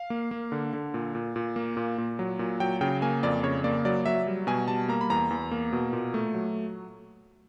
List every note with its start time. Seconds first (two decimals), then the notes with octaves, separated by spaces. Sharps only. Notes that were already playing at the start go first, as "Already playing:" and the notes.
Already playing: F5
0.10 A#3
0.31 A#3
0.52 D3
0.73 D3
0.94 A#2
1.15 A#2
1.36 A#2
1.56 A#3
1.77 A#2
1.98 A#2
2.19 F#3
2.39 A#2
2.60 F#3 G5
2.81 C#3 G5
3.02 A#3 G#5
3.23 F2 D5
3.43 C#3 C#5
3.64 A#3 D5
3.85 F#3 D5
4.06 F#3 E5
4.27 G3
4.47 B2 G#5
4.68 G3 A5
4.88 A#3 A#5
5.01 B5
5.10 E2 A#5
5.30 E2
5.51 A#3
5.73 B2
5.93 A#2
6.14 A3
6.34 F#3